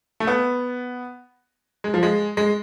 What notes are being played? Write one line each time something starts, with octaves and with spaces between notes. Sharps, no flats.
A3
B3
G#3
F3
G#3
G#3